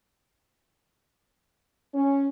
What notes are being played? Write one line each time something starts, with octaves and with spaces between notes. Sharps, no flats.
C#4